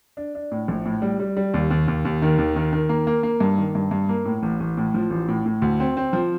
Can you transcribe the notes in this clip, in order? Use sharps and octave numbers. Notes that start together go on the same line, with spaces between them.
D4
D4
A2
A#1
A2
G3
G3
G3
D#2
D#2
D#2
D#2
D#3
D#2
D#3
D#3
A#3
A#3
A#3
G2
D#3
G2
G2
A#3
A2
A1
A1
A2
F3
A1
A2
A2
D2
C4
C4
F3